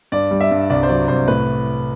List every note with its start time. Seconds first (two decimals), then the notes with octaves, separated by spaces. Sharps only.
0.12 G2 D5
0.31 G3
0.40 E5
0.51 G2
0.70 C2 D5
0.83 C5
0.89 F#3 D5
1.08 C2 C5
1.28 A2 B4